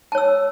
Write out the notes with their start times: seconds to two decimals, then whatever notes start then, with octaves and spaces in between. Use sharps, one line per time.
0.12 A5
0.15 C#5
0.18 E6